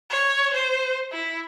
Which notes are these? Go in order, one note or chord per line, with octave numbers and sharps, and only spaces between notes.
C#5
C5
E4